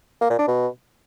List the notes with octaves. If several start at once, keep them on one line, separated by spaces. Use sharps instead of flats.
A#3
A#2
D4
B2